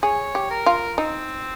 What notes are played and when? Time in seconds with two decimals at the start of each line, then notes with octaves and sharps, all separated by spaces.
0.03 G#4 C#5
0.35 G4
0.50 A#4
0.66 F4
0.98 C4 D#4